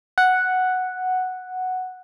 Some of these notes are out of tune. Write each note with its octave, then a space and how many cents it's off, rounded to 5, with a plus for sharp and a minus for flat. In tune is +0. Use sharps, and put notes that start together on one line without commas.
F#5 +0